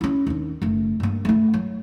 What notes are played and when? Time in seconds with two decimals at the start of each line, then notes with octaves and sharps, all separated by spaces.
0.01 C#4 E4
0.27 D#2 D4
0.62 F#1 A3
1.00 G2 A#3
1.25 A3 E4
1.54 F#3